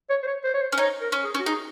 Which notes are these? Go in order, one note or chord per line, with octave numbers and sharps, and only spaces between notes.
C#5
C5
C#5
C5
C#5
C5
C#4
D#4 C#5
A#4
C#4
G#4
C#4
F#4
D#4 G#4